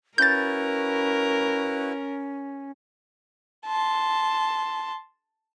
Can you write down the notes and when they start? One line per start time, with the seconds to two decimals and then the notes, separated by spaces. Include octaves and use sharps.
0.18 C#4 E4 F#4 A#4 B4 G6 A6
3.66 A5 C6